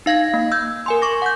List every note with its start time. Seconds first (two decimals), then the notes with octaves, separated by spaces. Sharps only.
0.06 D#4 F5 G#6 A#6
0.34 A#3
0.52 E6 G6 G#6
0.86 A#4 G#5 C6
1.02 C#6 D6 A#6
1.22 F#5 G6